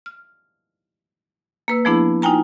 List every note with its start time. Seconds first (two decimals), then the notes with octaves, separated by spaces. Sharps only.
0.06 F6
1.68 A#3 B4 E6
1.85 F3 A3 B3 D4 E4 G#4
2.22 D#4 F4 G5 G#5 A#5